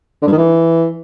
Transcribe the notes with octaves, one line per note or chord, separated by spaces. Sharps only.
D3
G2
D#3
E3